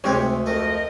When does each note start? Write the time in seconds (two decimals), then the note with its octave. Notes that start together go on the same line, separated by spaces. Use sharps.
0.04 D2 C3 G#3 C4 G4 C#5
0.46 F2 A3 A#4 D#5